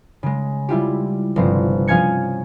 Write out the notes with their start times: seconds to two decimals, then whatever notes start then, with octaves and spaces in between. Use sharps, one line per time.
0.23 C#3 G#3
0.69 G3 E4 F4 G4
1.36 G1 C3 F3 C5
1.88 F3 C#4 F5 G#5 G#6 C#7